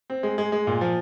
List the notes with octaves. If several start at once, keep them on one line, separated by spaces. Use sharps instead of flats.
C4
G#3
G#3
G#3
A#2
F3